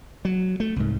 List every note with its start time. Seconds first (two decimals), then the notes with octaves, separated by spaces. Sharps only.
0.25 F#3
0.60 A3
0.76 C2 G#2